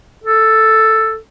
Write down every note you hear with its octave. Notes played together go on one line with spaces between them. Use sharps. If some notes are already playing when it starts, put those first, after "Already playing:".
A4